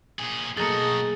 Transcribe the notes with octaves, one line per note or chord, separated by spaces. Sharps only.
A#2 G#4
B1 A3 A#3 F#4 G#4 D#5 A#5 A6